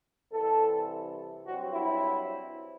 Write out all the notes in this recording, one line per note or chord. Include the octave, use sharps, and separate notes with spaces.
C2 C3 E3 A4
G2 F#3 C4 F#4
E4